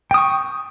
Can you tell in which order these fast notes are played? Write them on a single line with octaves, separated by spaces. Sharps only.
G5 D#6 C#6